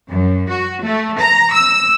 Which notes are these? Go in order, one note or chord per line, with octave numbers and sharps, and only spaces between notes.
F#2
F#4
A3
A#5
E6